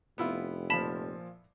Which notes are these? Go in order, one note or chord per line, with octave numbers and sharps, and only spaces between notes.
F1 B3 E4 F4
A#2 F3 A5 B5 B6